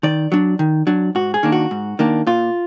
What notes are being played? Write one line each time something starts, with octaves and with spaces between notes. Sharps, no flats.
D#3 D5
F#3 D4
D#3
F#3 D4
G#2 F#4
G#4
D#3 A#3 D4
F#4
G#2
D#3 A#3 D4
A#2 F4